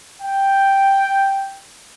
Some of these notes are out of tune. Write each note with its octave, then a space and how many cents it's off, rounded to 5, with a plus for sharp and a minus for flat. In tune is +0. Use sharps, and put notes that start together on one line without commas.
G5 +0